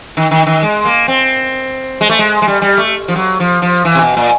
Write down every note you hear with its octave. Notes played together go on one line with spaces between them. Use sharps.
D#3
D#3
D#3
G#3
A#3
C4
G#3
A3
G#3
G#3
G3
G3
A3
F3
F#3
F3
F3
E3
C3
B2
A#2